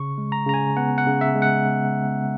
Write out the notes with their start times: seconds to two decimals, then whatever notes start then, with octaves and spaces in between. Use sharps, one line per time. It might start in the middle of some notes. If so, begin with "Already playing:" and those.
Already playing: C#3 C#6
0.18 G#3
0.32 A#5
0.46 C#3 A#5
0.54 G#5
0.77 B3 F#5
0.98 F#5
1.06 C#3
1.21 E5
1.35 G#3
1.42 F#5